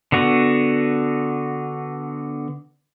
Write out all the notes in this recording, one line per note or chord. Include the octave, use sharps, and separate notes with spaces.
D3 B3 F#4